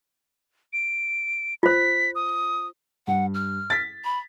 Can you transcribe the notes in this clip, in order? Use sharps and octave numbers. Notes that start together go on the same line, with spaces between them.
D7
F4 C5 B6
D#6
G2 F#5
F6
A6 B6
B5